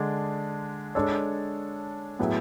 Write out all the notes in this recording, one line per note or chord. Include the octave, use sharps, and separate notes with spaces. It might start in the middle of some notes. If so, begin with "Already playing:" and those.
Already playing: D3 G#3 D4
G#3 D4 A4 C#5
A2 F#3 B3 E4 G#4